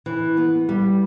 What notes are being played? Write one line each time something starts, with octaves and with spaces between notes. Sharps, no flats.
E3
B3
G3